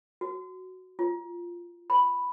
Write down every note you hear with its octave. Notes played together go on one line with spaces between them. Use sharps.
F#4
F4
B5